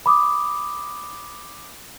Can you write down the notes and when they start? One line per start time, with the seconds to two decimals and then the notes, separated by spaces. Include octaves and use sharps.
0.06 B5 D6 D#6